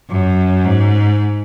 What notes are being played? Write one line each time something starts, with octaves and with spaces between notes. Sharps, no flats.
F#2
G#2